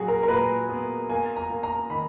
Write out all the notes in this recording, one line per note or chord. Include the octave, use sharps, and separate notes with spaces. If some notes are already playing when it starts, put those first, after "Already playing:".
Already playing: A#2 F#3 F#4 G#4
A#4
A#4
A#2 B4
B3
A#3 G#5
A#5
A#3
A#5
D#3 B5